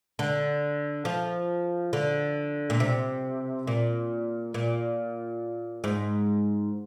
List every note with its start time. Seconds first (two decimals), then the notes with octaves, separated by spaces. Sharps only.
0.19 D3
1.05 F3
1.93 D3
2.70 A#2
2.80 C3
3.67 A#2
4.54 A#2
5.84 G#2